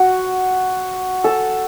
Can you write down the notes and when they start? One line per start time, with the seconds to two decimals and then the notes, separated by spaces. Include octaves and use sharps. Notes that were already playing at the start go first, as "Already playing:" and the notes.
Already playing: F#4
1.24 A4